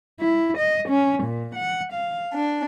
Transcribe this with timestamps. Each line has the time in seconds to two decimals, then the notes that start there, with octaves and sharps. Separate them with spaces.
0.18 E4
0.58 D#5
0.88 C#4
1.23 A#2
1.55 F#5
1.91 F5
2.32 D4